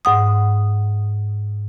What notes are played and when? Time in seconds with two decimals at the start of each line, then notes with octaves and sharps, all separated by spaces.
0.05 G#2 F#5 D#6